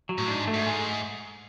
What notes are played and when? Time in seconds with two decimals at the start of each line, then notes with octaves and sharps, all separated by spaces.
0.09 F#3
0.18 A2
0.28 G#2 D4
0.47 A3
0.54 G#2
0.66 G#4